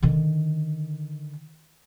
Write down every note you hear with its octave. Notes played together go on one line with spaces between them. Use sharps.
D3 D#3